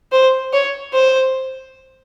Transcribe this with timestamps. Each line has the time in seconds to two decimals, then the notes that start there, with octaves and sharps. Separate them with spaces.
0.12 C5
0.53 C#5
0.93 C5